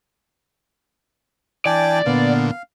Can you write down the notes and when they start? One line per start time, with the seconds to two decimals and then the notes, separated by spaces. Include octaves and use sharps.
1.66 E3 D4 D5 G5 G#5
2.06 A#2 D3 B3 F5